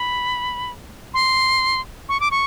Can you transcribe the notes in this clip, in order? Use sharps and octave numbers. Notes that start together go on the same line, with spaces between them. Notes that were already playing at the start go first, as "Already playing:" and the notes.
Already playing: B5
C6
C#6
D6
C#6